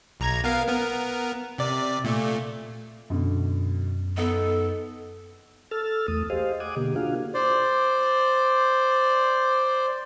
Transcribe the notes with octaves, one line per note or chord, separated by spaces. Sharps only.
B1 A#5 G#6
B3 A#4 F5
B3 A#4
C3 D5
A#2 A3
F#2 B2 D3
B3 D#4 A4
A4 E6 F6 A6
E2 A3 D#6
G4 G#4 C5 D#5 F5
D#5 F#5 G#5 D6 D#6
B2 D3 A#3 G4
A#3 D4 F4 F#4 G#4 F5
C5 D5